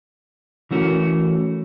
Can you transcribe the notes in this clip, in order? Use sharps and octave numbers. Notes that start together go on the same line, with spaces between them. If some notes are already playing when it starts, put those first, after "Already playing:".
E3 A3 C#4 F#4 A#4